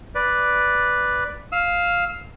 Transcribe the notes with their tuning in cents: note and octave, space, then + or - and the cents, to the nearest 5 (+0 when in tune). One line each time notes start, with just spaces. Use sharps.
B4 +0 D5 +0
F5 +5 E6 -25